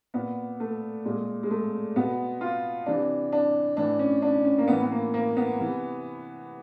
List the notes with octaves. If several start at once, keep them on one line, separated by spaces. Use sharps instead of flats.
A#2 B3
A3
A#2 G#3
G#3
A3
B2 B3
F4
C3 E3 D4
D4
A2 E3 D4
C#4
D4
C#4
A#3
A2 E3 B3
B3
A#3
A#3
B3
C3 E3